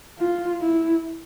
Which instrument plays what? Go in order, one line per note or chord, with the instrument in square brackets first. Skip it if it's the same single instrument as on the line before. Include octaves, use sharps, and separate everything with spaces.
[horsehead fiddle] F4
E4